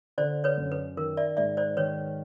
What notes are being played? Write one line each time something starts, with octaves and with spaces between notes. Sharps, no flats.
D3 C5 D5
B4 C#5
F#2
B4
D#3 A#4
D5 E5
G#2 D5 E5
C5 D5
D#3 B4 C#5